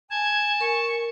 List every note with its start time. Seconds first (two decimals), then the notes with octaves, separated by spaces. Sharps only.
0.10 G#5 A5 G#6
0.60 A#4 C#6